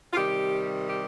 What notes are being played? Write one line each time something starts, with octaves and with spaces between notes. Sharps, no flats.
F4
C3 D#3 G3 G4
G4